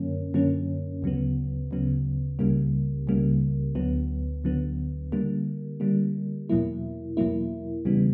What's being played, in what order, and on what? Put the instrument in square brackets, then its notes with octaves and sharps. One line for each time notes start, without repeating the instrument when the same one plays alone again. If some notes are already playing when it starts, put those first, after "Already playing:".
Already playing: [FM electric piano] F#2 D3 F#3 A#3 C#4
F#2 D3 F#3 A#3 C#4
D2 C#3 F#3 B3
D2 C#3 F#3 B3
C#2 C#3 G3 A#3
C#2 C#3 G3 A#3
D2 D3 F#3 B3
D2 D3 F#3 B3
D3 G3 A#3
D3 G3 A#3
E2 B2 F#3 A#3 E4
E2 B2 F#3 A#3 E4
E2 C#3 E3 G3 B3